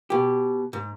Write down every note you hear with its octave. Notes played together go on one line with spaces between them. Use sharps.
B2 G4
G#2